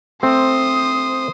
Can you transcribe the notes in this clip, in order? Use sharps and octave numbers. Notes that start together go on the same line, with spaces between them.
A3 C4 C5 D#6